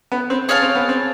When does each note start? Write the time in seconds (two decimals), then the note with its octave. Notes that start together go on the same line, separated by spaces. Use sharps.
0.12 B3
0.30 C4
0.48 C#4 G#4 C#5 F5 A5
0.62 C4
0.75 B3
0.89 C4